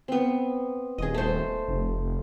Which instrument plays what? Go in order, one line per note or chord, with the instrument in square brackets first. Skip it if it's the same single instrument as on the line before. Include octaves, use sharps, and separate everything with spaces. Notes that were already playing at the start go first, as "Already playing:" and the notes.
[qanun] B3 C4
[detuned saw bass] D#1 [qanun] G#4 D#5
[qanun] A3 C5
[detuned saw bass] F1